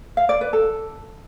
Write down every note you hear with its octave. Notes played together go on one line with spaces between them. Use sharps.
F5
D5
B4
A4